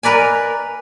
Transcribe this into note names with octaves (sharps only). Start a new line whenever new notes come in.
A#4 B4 D5 G#5